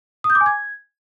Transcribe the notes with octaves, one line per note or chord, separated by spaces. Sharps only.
D#6
G6
D6
G#5
G#6